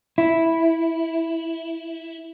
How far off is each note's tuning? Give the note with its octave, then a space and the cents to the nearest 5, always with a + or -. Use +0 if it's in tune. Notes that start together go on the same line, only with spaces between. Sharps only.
E4 -5